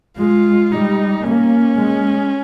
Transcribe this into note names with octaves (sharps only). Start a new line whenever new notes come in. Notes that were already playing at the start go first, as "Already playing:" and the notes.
G#3 F4
G3 D#4
A#3 C#4
G#3